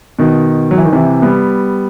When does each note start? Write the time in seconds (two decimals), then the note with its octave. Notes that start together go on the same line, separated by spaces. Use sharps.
0.19 B2 D#3
0.71 F#3
0.78 E3
0.85 D#3
0.93 C3 E3
1.22 G3 B3